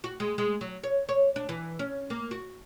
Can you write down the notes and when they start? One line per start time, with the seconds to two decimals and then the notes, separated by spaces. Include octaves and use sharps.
0.04 F#4
0.20 G#3
0.38 G#3
0.61 F#3
0.83 C#5
1.09 C#5
1.36 D4
1.49 E3
1.79 C#4
2.10 A#3
2.31 F#4